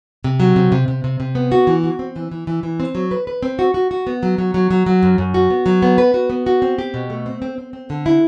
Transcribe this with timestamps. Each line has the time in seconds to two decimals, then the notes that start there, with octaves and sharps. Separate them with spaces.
0.24 C3
0.40 F#3
0.56 C3
0.72 C3
0.88 C3
1.04 C3
1.20 C3
1.35 B3
1.52 F#4
1.67 E3
1.84 F#4
1.99 C4
2.16 E3
2.31 E3
2.47 E3
2.63 E3
2.80 C4
2.95 F#3
3.11 B4
3.27 B4
3.43 C4
3.59 F#4
3.74 F#4
3.91 F#4
4.07 B3
4.23 F#3
4.38 F#3
4.54 F#3
4.71 F#3
4.86 F#3
5.03 F#2
5.18 F#2
5.34 F#4
5.50 B3
5.66 F#3
5.82 B3
5.98 B4
6.14 F#4
6.30 B3
6.46 F#4
6.62 C4
6.79 G4
6.94 B2
7.10 A3
7.26 C4
7.42 C4
7.58 C4
7.73 C4
7.90 D3
8.06 E4